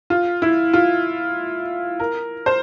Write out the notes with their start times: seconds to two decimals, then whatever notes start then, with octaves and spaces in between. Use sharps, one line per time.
0.10 F4
0.42 E4
0.73 F4
2.00 A#4
2.46 C5